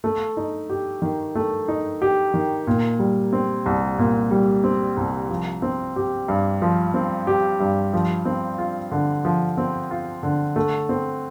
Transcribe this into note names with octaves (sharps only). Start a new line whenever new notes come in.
A3
D#4
G4
D#3
A3
D#4
G4
D#3
A#2
G3
C4
C2
A#2
G3
C4
C2
F3
C4
G4
G2
F3
C4
G4
G2
F3
C4
F4
D3
F3
C4
F4
D3
A3
C4